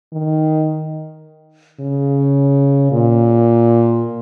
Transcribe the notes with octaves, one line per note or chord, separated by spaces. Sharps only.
D#3
C#3
A#2